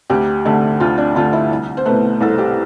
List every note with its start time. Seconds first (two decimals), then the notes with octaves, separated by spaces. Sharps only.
0.10 D2 G4
0.45 D3 A3
0.80 D2 F4
0.98 D4
1.15 D3 A3 F4
1.33 E4
1.51 C2
1.77 C5
1.85 B2 A3 B4
2.21 C2 A4
2.38 G4